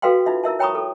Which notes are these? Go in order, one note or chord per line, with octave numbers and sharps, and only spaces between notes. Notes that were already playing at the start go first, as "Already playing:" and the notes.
F#4 A4 B4 F5 G5 C6
D#4 F4 E5
E4 A#4 E5 A5
C#5 G5 A#5 B5 C#6 D#6
A4